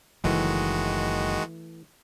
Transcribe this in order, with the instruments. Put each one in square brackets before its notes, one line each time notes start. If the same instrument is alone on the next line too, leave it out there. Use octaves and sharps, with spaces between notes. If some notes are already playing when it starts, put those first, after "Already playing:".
[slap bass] F#1 F#3 [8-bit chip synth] D#3 G#3 F#4 [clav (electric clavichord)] E3 A3